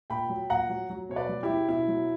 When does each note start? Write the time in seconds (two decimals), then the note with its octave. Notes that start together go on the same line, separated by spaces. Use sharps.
0.10 A#2 G5 B5
0.30 F#3
0.50 A#2 F#5 A#5
0.69 F#3
0.90 F#3
1.09 B2 C#5
1.16 B4 D5
1.29 F#3
1.43 E4 G4
1.49 F#3
1.69 B2 E4
1.88 F#3